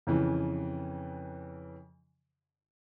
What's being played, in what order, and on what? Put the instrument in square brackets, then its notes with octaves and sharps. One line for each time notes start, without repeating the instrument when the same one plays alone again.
[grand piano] F2 C#3 E3